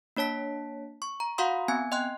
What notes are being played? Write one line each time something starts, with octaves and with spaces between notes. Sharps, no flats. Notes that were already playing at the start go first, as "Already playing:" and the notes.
A#3 D4 C#5 A5 B6
C#6
A#5
F#4 F5 F#5 A#5 C6 D#6
B3 C4 G#5 G#6
D#5 G5 C6 F#6